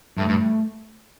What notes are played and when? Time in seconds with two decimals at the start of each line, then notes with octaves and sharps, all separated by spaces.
0.18 G2 A3
0.28 G2